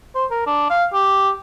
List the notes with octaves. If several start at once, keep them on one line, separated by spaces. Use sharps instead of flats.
C5
A#4
D4
F5
G4